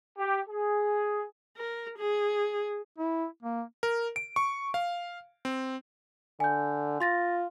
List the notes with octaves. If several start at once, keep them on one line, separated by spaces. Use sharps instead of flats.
G4
G#4
A#4
G#4
E4
A#3
A#4
D7
C#6
F5
C4
D3 G#5 G6
F4 C6 A6 A#6